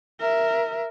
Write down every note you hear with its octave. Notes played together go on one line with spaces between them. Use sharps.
A#4 E5